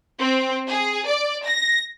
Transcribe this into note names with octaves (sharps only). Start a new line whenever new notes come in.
C4
G#4
D5
A#6